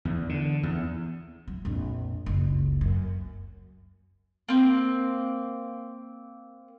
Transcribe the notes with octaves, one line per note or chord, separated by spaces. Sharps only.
E2
D3
E2
F#3
A#1 F2
F#1 C#2
F#2
A#3 C4